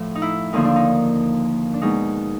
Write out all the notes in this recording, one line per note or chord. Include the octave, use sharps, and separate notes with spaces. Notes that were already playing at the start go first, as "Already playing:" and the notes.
Already playing: A2 F3 A3
D#4
E4
D#2 D3 F3 A#3 D#4
D4
D#4
D4
B2 G#3 D#4